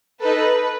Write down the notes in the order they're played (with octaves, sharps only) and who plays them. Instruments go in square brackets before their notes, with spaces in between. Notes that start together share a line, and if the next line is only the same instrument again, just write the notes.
[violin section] D#4 A4 B4